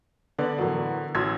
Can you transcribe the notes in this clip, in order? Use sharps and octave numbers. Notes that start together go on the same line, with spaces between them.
D3 B3 B4 D5
A2 E3 F#3 F#4 A#4
A1 E4 F#4 C6 E6 G#6